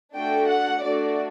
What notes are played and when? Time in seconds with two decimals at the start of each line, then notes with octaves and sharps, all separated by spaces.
0.14 A3 D4 F#4 A4 G5
0.47 F#5
0.81 A3 D4 F#4 D5